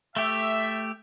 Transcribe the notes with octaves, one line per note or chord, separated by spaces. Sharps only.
A3 G4 E5